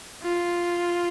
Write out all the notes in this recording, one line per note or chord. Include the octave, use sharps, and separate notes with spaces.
F4